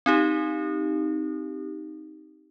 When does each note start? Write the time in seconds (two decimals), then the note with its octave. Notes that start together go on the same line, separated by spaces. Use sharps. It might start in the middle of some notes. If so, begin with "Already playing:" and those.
0.06 C4 D#4 G4